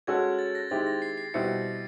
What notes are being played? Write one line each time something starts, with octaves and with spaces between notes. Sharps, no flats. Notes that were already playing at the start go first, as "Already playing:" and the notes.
G#3 C#4 F#4 A4 G#6
A6
A#6
D#3 G#3 C4 E4 G4 A6
A#6
C7
C7
B2 G3 C4 E4 C#7